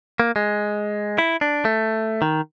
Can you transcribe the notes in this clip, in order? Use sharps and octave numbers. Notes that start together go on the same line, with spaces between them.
A#3
G#3
E4
D4
A3
D#3